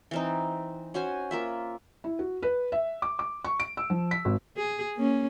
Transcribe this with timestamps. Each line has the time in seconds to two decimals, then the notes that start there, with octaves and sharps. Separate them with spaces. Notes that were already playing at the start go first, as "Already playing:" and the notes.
0.11 E3 C4 D#4
0.94 C#4 F#4 C5 G#5
1.31 A#3 F4 E5
2.04 E4
2.19 F#4
2.42 B4
2.72 E5
3.02 D6
3.19 D6
3.45 C#6
3.60 D7
3.77 E6
3.90 F3
4.11 B6
4.25 G#1
4.57 G#4
4.96 A#3 C#4